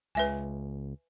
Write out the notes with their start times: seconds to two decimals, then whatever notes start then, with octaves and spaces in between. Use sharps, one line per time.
0.15 C#2 B4 E5 G#5